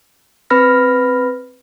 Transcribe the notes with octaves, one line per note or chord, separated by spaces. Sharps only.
C4 B4 B5 F6 A#6